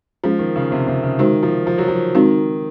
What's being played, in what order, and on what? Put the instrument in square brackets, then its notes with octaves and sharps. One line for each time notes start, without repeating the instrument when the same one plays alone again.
[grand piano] F3 [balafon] G#3 C#4 G#4
[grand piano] D#3
C#3
C3
C3
C#3
[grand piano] D#3 [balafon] G#3 D#4 F#4 C5
[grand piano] F3
F3
F#3
F3
[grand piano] D#3 [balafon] G#3 C4 D#4 F#4